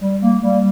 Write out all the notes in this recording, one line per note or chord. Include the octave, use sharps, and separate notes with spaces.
G3
A#3
G3